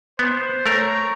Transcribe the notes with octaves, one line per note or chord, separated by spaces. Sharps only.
B3 C5
A3 A#4 C#5 A#5